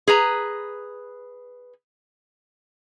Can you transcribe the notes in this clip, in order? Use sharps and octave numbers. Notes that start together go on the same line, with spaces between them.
G#4 B4 A#5